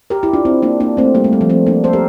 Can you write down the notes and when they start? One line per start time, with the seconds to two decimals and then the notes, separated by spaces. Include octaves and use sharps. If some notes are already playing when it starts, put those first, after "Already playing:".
0.10 G4 A#4
0.23 E4 G4
0.33 D4 F4
0.45 C4 E4
0.62 A#3 D4
0.80 A#3 D4
0.97 A3 C4
1.15 G3 A#3
1.24 A3
1.33 G3
1.41 F3
1.50 A3 C4
1.67 A#3 D4
1.84 A4 C5
1.93 G4 A#4